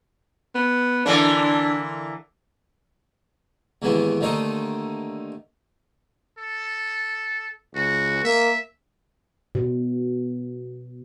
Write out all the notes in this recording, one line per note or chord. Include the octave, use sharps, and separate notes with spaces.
B3
D3 E3 A#3 D4
D#2 G#2 C#3 E3 B3
D#2 D3 A3 D#4 C5 D#6
A4
C#2 F#4
A#3 E5
B2